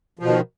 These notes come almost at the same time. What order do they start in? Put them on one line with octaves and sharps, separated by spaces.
F3 B2 D#3